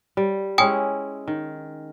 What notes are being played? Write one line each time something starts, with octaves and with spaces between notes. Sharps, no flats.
G3
G#3 C#4 E4 G5 G#5 D#6
D#3